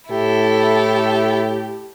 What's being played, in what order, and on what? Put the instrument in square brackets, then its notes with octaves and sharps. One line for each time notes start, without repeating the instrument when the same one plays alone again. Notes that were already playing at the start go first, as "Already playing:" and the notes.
[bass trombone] A2 [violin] E4 A4 [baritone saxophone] G4